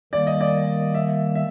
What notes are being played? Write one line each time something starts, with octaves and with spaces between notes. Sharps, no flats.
D#3 G3 A#3 D5
D#5
D5
E5
E5